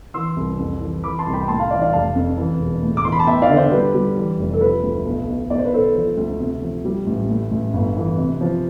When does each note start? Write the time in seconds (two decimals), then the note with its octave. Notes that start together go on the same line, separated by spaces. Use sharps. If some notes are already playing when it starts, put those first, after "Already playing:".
0.14 E3 C6 E6
0.37 C2
0.59 F2
0.81 E3
1.03 E3 B5 D6
1.19 A5 C6
1.26 C2
1.33 G5 B5
1.48 A2 A5 C6
1.59 F5 A5
1.71 E3 D5 F5
1.82 D5 F5
1.93 F1 F5 A5
2.15 F2
2.37 E3
2.60 E1
2.82 A2
2.97 D6
3.05 E3 C6
3.12 B5
3.19 A5
3.27 E2 E5 G5
3.42 D5 F5
3.49 D3
3.56 C5 E5
3.71 G3 B4
3.94 G3
4.17 E3
4.39 F1
4.54 A4
4.61 F3 B4
4.83 D2
5.05 B1
5.28 B2
5.50 B1 D5
5.58 C5
5.66 B4
5.73 B1 A4 C5
5.95 F3
6.17 D2
6.40 C3
6.62 F3
6.85 G3
7.07 A1
7.29 A2
7.51 A1
7.73 G1
7.96 E3
8.18 C3
8.41 F3